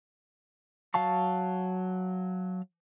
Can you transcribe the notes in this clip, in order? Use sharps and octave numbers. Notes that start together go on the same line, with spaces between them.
F#3 F5 A5 C#6